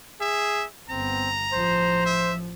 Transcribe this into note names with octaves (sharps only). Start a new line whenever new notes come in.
G#4 E5
G1 B3 C4 A#5
A1 F3 C5
E5